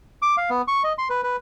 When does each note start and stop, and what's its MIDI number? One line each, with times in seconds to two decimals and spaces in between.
0.22 0.36 86
0.37 0.50 77
0.50 0.62 59
0.68 0.83 85
0.84 0.93 75
0.98 1.08 84
1.10 1.21 71
1.23 1.36 71